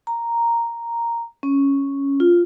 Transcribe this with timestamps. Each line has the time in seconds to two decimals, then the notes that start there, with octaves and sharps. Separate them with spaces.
0.07 A#5
1.43 C#4
2.20 F4